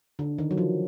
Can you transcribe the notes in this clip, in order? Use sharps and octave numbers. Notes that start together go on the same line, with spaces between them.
D3
D#3
F#3
F3